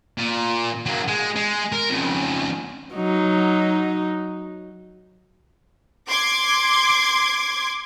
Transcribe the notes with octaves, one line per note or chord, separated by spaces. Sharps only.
A#2
F#3 A#3
G#3
G#3
A#4
F2 C#3
F#3 D#4
C6 D6 G#6